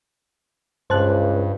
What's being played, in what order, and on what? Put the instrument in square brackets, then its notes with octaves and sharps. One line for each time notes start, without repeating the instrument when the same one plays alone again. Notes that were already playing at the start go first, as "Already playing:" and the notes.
[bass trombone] C#2 [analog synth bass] G2 [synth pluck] C5 A5 F#6